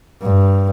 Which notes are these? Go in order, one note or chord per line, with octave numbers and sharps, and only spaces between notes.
G2